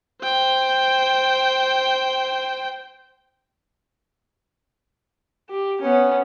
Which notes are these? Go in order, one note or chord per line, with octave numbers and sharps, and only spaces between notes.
C5 G5
G4
B3 C#4